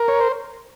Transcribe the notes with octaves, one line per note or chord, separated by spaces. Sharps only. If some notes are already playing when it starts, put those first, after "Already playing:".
Already playing: A#4
C#5
C5